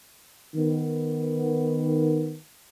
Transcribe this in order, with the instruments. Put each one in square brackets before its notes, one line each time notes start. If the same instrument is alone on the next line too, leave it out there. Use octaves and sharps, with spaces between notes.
[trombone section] D#3 B3